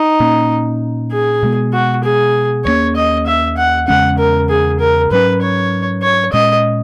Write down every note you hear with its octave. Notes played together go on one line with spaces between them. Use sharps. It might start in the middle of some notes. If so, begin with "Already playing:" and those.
Already playing: D#4
A#2 A#3 C#4
G#4
B2 G#3 B3
F#4
G#4
D#2 D#3 A#3 C#4 C#5
D#5
E5
F#5
E2 C#3 G#3 C#4 F#5
A#4
G#4
A#4
G#2 F#3 C#4 B4
C#5
C#5
A#2 G#3 C#4 D#5